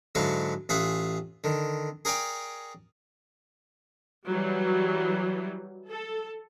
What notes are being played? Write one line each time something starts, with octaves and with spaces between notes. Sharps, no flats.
G#2 D3 F#3 E4 F5 C#6
A1 F4 G#4 E5 F#5
D3 D#3
G#4 A#4 C#5 D5 G5 G#5
E3 F#3 G3
A4